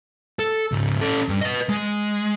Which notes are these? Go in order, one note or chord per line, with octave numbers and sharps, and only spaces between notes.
A4
C#2 G#2
C#4 A4
G2
B4 D#5
G#3